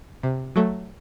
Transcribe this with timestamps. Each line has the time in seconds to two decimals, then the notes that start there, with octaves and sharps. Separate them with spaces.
0.23 C3
0.56 F#3 A3